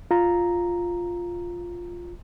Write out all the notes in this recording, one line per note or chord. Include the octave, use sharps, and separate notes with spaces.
F4 A#5